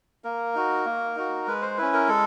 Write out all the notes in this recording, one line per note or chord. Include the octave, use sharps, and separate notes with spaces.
A#3 A#4
D#4 F#4
A#3
D#4 F#4
G#3 B4
C5
C#4 E4 B4
A#4
G#3 A4